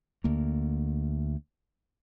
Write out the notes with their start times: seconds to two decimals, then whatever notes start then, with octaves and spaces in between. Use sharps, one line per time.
0.24 D2 A#3